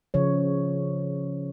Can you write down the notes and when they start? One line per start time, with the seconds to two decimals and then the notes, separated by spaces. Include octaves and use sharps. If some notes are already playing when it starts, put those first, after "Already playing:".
0.14 C#3 F3 C#5